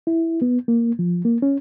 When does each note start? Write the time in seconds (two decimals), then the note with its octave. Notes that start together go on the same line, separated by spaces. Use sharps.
0.07 E4
0.42 B3
0.68 A#3
0.99 F3
1.25 A#3
1.42 C#4